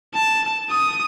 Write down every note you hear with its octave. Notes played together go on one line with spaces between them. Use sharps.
A5
D#6